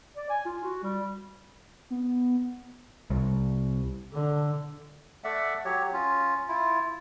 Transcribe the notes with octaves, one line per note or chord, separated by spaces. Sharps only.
D5
G#5
F4
F#4
G3
B3
C2
D3
A3 D5 E5 F#5
F#3 G4 C#5
C#4 F4
E4 F4